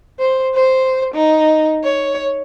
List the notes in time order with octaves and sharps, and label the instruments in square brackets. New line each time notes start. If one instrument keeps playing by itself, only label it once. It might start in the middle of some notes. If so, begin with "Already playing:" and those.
[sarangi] C5
C5
D#4
C#5